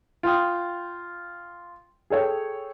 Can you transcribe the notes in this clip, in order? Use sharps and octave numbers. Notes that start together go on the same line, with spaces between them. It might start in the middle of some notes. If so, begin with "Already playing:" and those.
F4 G5 D#6
G#4 A4 C#5 G5